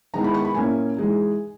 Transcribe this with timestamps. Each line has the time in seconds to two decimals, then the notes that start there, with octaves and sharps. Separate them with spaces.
0.14 D#3 G#3 B3 E4 A#5
0.24 B5
0.34 C#6
0.45 B5
0.55 A#2 A#3 C#4 E4 G#5
0.97 E3 G#3 D#4